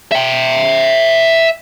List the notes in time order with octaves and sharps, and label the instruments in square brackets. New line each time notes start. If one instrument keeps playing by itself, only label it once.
[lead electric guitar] E5 G5